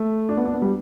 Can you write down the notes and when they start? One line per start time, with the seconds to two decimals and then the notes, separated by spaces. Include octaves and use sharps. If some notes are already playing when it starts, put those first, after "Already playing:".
Already playing: A3
0.29 D4
0.37 B3
0.45 D4
0.54 B3
0.62 G3